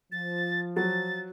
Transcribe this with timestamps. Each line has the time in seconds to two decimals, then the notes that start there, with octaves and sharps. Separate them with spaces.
0.12 F3 A6
0.76 F#3 A6